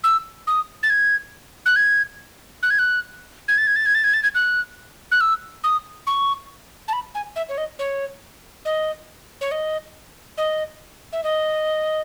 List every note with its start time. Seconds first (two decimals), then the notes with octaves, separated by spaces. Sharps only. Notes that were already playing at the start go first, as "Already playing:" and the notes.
0.04 E6
0.47 D#6
0.83 A6
0.90 G#6
1.66 F#6
1.76 G#6
2.63 F#6
2.70 G#6
2.79 F#6
3.48 G#6
3.58 A6
3.67 G#6
3.76 A6
3.86 G#6
3.95 A6
4.04 G#6
4.14 A6
4.23 G#6
4.35 F#6
5.12 F#6
5.21 E6
5.64 D#6
6.07 C#6
6.88 A5
6.93 B5
7.15 G#5
7.36 E5
7.49 C#5
7.58 D#5
7.79 C#5
8.65 D#5
9.41 C#5
9.51 D#5
10.38 D#5
11.13 E5
11.24 D#5